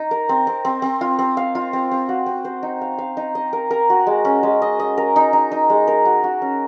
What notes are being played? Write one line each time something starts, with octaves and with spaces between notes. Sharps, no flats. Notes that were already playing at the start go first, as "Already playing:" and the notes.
Already playing: D#4
A#4
C4
C4
C4
C4
F4
C4
F5
F4
C4
C4
F#4
C4
C5
D#4
F5
F5
D#4
D#5
A#4
A#4
F#4
G#3
C#4
G#3
D#5
D#5
A#4
D#4
D#4
D#4
G#3
A#4
F#4
F#4
C#4